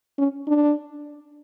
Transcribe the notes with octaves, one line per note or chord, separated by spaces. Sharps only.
C#4
D4